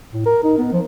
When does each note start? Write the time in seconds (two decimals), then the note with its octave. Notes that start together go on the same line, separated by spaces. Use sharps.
0.13 A2
0.26 A#4
0.44 D#4
0.58 B3
0.73 F3